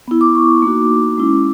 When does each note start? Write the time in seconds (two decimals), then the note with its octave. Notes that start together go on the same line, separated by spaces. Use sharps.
0.08 B3 E4
0.21 D6
0.35 C#6
0.49 D6
0.62 A#3 D#4 F#4 D6
1.18 G#3 C#4 E4